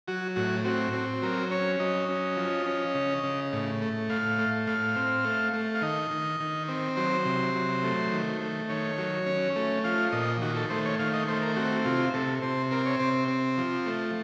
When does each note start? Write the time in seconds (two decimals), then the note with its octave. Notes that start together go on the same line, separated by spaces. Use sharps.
0.08 F#3 F#4
0.36 A2 F#4
0.65 C4 F#4
0.93 C4
1.22 F#3 A#4
1.51 C#4 C#5
1.79 F#3 D#5
2.09 C#4
2.37 F3
2.66 C#4
2.95 C#3
3.23 C#3
3.53 A2
3.82 A3
4.09 A2 F5
4.38 A3
4.67 A2 F5
4.96 C4
5.25 A3
5.54 A3
5.75 F5
5.82 D#3 D#5
6.11 D#3
6.40 D#3
6.68 C4
6.97 F#3 C5
7.25 C3
7.55 F#3
7.84 A3
8.12 D#3
8.41 A3
8.69 D#3 C#5
8.98 F#3
9.26 C#4
9.56 A3
9.84 F3 F5
10.12 A#2 D#5
10.41 D#3 F#4
10.56 A4
10.70 A3 C5
10.85 C#5
10.99 D#3 F5
11.13 D#5
11.28 A3 C5
11.42 A#4
11.56 C4 F#4
11.85 C3 F4
12.14 C3 A4
12.42 C3 C5
12.71 C4 A#4
12.86 C#5
12.99 C3 C5
13.28 C4
13.58 F3
13.86 A3